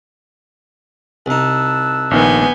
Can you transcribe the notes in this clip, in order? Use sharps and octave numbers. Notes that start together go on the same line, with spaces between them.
C2 D#4 A5 E6 F#6
A#1 D#3 B3 G#5 G6